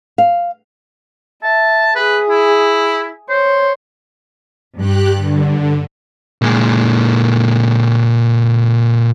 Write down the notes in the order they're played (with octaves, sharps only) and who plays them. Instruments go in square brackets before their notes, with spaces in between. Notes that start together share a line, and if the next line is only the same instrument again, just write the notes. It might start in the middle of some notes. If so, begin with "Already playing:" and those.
[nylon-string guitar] F5
[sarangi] E5 [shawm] A5
[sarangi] G#4 [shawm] B4
[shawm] E4
[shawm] C5 [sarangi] C#5
[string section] G2 [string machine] G4 F#6
[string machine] D3
[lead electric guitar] A#2 G#3